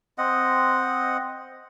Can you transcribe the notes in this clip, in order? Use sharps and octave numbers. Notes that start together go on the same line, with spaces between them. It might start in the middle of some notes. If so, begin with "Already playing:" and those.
C4 D#5 F#5